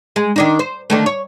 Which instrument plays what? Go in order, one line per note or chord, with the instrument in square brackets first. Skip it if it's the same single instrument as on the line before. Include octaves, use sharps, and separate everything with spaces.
[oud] G#3
D#3 D4 D#4
C5
D3 D#3 A3
C#5